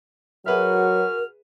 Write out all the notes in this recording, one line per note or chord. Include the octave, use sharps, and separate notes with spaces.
F#3 F#4 G#4 A#4 B4 E5 F6